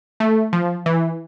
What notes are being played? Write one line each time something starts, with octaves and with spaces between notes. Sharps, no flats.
A3
F3
E3